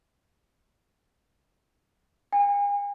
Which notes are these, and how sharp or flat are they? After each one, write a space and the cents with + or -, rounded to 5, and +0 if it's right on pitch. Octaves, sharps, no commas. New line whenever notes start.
G#5 -40